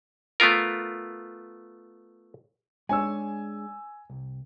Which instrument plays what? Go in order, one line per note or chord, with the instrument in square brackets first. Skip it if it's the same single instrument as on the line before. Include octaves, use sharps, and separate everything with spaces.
[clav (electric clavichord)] A3 B3 F4 A#4
[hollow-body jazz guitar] G#3 D4 C#5 [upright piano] G#5 E6
[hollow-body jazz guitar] C2